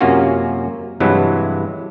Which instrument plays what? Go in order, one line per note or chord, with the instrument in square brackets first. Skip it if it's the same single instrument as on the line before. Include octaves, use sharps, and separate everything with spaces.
[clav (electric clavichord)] F#2 C3 A#3 C#4 F4 F#4
G2 C3 E3 F#3 G#3 E4